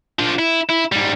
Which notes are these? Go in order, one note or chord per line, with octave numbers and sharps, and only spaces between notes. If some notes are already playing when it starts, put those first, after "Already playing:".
F3 D4
E4
E4
G#2 G3